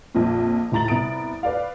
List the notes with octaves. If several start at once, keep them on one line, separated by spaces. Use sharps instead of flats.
A#1 F2 A#2
C#2 A2 A#5 A6 F#7
C2 B3 A#5 D#6 D7
B4 D5 F5